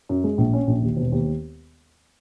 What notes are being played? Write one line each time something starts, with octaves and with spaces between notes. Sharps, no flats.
F#2
G#3
A#1
C#4
A#1
D#2
E1
D#2